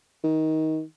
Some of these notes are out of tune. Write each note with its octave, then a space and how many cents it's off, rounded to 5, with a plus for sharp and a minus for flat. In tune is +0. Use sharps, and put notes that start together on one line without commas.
D#3 +20